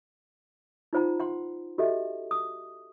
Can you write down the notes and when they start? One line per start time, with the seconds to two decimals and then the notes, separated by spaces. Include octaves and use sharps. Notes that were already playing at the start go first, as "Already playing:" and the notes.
0.93 D#4 F4 C5 F#5 A#5
1.20 F#5 C6
1.78 F#4 G4 A4 D#5 E5
2.31 D#6